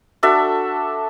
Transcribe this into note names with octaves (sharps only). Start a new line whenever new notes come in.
D4 F#4 A4 E5